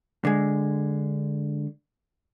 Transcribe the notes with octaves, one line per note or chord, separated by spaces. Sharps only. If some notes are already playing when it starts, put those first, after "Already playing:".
D3 G#3